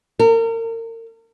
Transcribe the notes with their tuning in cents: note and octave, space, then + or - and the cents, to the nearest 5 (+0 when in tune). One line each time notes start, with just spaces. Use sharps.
A#4 -35